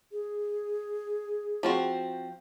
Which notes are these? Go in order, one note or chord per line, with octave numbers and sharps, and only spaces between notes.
G#4
F3 C4 F#4